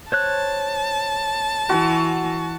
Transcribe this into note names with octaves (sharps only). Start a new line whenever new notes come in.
C5 C#5 A5 F#6
E3 F#4